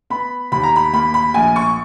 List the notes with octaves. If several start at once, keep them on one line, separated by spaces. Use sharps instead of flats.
B3 B5
D#2 B5
A#5
B5
A#3 B5
B5
A#1 G#5
C#6